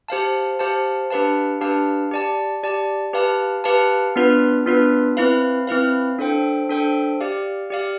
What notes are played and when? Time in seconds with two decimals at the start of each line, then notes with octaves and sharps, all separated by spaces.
0.08 G4 C5 F5 A5
0.59 G4 C5 F5 A5
1.10 D4 G4 B4 F5 A5
1.61 D4 G4 B4 F5 A5
2.11 G4 D5 A5
2.63 G4 D5 A5
3.13 G4 B4 F5 A5
3.64 G4 B4 F5 A5
4.16 B3 D4 F4 B4
4.66 B3 D4 F4 B4
5.17 C4 E4 B4 F5
5.67 C4 E4 B4 F5
6.19 D4 A4 C5 G5
6.69 D4 A4 C5 G5
7.20 G4 D5 F5
7.70 G4 D5 F5